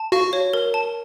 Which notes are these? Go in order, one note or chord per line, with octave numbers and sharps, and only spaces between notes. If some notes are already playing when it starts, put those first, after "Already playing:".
Already playing: A5
F#4 F5
C#5
A#4
A5